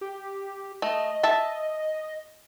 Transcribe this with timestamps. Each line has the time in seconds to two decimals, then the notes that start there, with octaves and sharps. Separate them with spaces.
0.01 G4
0.82 A3 D#5
1.23 E5 A5